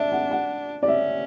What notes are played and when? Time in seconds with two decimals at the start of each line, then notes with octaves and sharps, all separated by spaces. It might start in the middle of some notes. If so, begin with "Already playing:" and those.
Already playing: D4 D5 E5
0.12 F#5
0.31 F#5
0.83 D5
0.88 C#4 E5